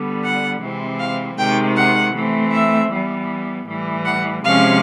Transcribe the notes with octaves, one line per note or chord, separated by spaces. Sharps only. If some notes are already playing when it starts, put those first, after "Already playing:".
Already playing: D3 G3 B3
F#5
C3 E3 G#3 C4
F5
C3 D#3 G#3 G5
F#5
E3 A3 C4
E5
E3 G3 B3
A2 E3 G3
F#5
C3 F3 G#3 C#4 F5